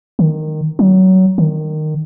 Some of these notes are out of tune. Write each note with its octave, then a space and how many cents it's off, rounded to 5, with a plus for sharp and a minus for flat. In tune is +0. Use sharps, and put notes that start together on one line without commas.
D#3 -10
F#3 +20
D#3 -15